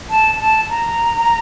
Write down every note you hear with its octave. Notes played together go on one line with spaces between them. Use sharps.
A5
A5
A#5